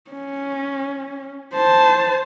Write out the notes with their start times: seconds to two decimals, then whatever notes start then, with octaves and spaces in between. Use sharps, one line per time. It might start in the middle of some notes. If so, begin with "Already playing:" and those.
0.11 C#4
1.55 C5 A5